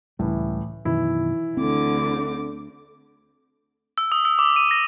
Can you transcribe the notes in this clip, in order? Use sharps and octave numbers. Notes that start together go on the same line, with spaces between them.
C#2 A2 E3 G3
F#2 B2 D#3 E3 E4
D2 D3 C4 D6
E6
D#6
E6
D6
D#7
A#6